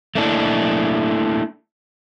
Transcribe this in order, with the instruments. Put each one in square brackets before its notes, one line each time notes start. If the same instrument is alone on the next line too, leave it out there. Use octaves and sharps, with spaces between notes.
[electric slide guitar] A3 A#3 D4 E4